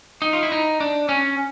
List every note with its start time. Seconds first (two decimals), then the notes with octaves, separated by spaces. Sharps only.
0.22 D#4
0.33 F4
0.43 E4
0.52 D#4
0.80 D4
1.09 C#4